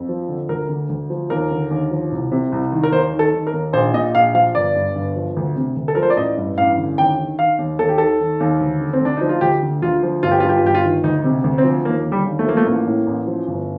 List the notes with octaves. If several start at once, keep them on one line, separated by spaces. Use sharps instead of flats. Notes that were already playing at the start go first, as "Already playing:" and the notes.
Already playing: F2
F3
D3
D2 A#4
D3
D2
F3
D#2 A#4
D3
D#2
F3
C2
C3
C2
D#3
A#4
D#2 C5
D#3
A4
D#3
A#4
D#2
A#1 C5
A#2 D#5
A#1 F5
F3 F5
G1 D5
G2
G1
F3
D2
C3
D2
A4
F3 A#4
C5
D5
A1 D#5
G2
A1 F5
D3
D#2 G5
D#3
D#3 F5
D#2
D#2 A4
G4
D#3 A4
D#3
D#2
D2
D3
C4
D2 D4
F3 D#4
F4
D2 G4
D3
D2 F4
F3
G1 F4
G4
G2 F4
G4
F4
G1 G4
F4
D#3
D2 D#4
C3
D2
C4
F3
D#2 A#3
D3
G3
D#2
A3
F3 A#3
A3
A1 A#3
A2
A1
F3
G1